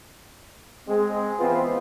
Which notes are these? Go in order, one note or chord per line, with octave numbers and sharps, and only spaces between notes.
G#3 C4
E3 B3 C4 F4 B4